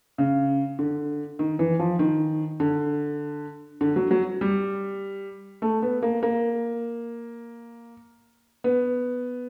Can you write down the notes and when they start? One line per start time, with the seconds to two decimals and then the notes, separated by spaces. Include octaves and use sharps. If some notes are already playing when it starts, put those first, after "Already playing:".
0.18 C#3
0.79 D3
1.39 D#3
1.59 E3
1.79 F3
1.99 D#3
2.60 D3
3.81 D3
3.96 F#3
4.11 F#3
4.41 G3
5.62 A3
5.82 B3
6.03 A#3
6.23 A#3
8.64 B3